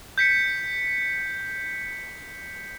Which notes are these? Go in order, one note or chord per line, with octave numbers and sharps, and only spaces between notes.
G6 B6 C#7